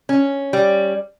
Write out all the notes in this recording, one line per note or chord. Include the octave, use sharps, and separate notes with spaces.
C#4
G3